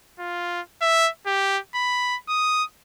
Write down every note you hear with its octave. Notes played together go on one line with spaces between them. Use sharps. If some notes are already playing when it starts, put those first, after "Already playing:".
F4
E5
G4
B5
D#6